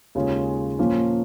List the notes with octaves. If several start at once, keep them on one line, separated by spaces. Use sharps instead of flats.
D#2 C#3 G#3 C#4 F4
A#2 F3 A#3 C#4 F4